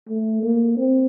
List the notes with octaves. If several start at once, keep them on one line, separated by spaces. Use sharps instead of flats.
A3
A#3
C4